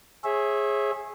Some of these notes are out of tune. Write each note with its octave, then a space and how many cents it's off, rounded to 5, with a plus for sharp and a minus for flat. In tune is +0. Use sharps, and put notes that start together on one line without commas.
G#4 +0 C#5 -35 E5 -10